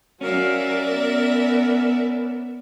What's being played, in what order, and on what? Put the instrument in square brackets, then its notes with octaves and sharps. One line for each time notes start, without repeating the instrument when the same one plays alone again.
[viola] F#3 F5 [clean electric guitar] C#4 [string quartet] A#4 D5 E5
[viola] B3